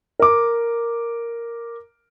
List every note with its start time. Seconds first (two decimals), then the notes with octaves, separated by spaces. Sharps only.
0.20 A#4 D6